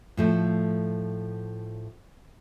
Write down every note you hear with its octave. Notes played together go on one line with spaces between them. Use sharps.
A2 F3 A3